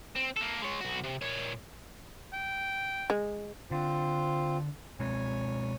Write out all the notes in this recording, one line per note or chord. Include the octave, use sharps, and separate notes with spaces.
C4
A#3 A4
G#3 C#5
B1 F#4
C3
A#2 C#5
G5
G#3
D3 C4 F4 C5
B2 G#3 C4 C#5 G#5